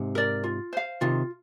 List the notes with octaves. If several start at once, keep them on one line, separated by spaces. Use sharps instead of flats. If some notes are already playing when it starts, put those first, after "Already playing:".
Already playing: G#2 C3
A#4 D5
F4
C5 F5
C3 D#3 F4